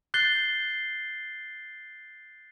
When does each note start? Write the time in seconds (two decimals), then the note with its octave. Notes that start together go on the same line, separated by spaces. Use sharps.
0.14 F#6 G6 A6 C7 G7